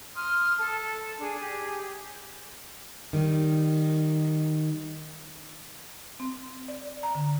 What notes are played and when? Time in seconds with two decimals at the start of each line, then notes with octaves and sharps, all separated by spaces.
0.15 C6 D#6 F6
0.58 A4 A5
1.19 D4 G#4
1.40 G4 G#4
3.13 D#3 G3
6.20 C4
6.68 D5
7.03 A#5
7.15 D3